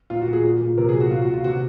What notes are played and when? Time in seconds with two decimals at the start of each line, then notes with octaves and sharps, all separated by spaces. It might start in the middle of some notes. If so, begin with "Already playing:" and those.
0.10 A#2 F4
0.21 F#4
0.27 A#2
0.33 G#4
0.44 A#2
0.61 A#2
0.77 C3 A#4
0.89 G#4
0.94 F#3
1.00 F#4
1.11 A#2 F4
1.22 F#4
1.28 A#2
1.34 F4
1.44 C3 F#4